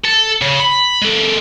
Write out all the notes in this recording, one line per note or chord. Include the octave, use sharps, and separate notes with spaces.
A4
C#3
B5
G#3 A4